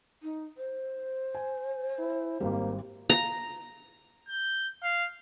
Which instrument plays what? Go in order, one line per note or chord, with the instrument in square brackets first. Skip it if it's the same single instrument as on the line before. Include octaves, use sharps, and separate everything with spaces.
[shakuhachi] D#4
C5
[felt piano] G#5
[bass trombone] E4
[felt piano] G#1 G3 [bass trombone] A#3
[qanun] A#5
[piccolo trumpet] G6
F5